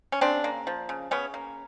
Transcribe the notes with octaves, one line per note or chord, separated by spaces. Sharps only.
C#4
C#3 C4 D4
A#3
F3
C#3
C#3 B3 C#4
A#3